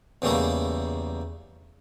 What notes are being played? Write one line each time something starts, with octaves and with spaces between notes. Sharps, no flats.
E2 C#3 G3 A3 A#3 A#4